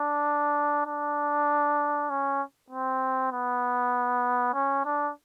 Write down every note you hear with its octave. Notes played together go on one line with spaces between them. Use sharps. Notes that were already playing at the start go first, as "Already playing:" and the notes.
Already playing: D4
D4
C#4
C4
B3
C#4
D4